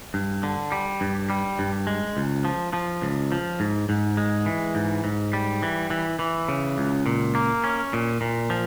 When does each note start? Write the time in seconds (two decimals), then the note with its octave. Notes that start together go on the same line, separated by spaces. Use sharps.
0.14 G2
0.43 D3
0.72 G3
1.01 G2
1.30 G3
1.59 G2
1.87 G#3
2.17 C#2
2.45 F3
2.73 F3
3.02 C#2
3.32 F3
3.60 G#2
3.89 G#2
4.17 G#3
4.46 E3
4.75 G#2
5.04 G#2
5.33 G3
5.63 E3
5.90 E3
6.19 E3
6.48 C#3
6.78 C#2
7.06 A#2
7.35 A#3
7.64 C#4
7.93 A#2
8.21 A#2
8.50 F3